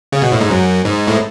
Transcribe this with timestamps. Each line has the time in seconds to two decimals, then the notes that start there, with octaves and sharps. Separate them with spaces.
0.12 C#3
0.22 B2
0.32 A2
0.41 G#2
0.50 F#2
0.85 G#2
1.07 A2